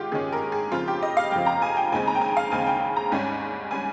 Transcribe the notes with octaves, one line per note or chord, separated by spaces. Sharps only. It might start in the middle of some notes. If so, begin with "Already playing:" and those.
Already playing: G#2 D#3 G#3 F4 G4
G#2 D#3 G#3 C#4 G#4
A#4
G#4
F2 C#3 F3 C4 F4
G4
D#5
F5
F2 C#3 F3 C4 G5
A#5
G#5
G5
D#2 C#3 G#3 C4 G#5
A#5
G5
G#5
F5
D#2 C#3 G#3 C4 G#5
G5
A#5
G#1 G#2 G3 C#4 G#5
G3 C#4 G#5